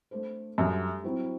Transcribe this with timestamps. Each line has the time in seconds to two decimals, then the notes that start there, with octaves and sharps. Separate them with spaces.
0.11 A3 D4 A4 C5
0.57 F#2 G3 D4 A4 E5
1.04 F#3 C4 E4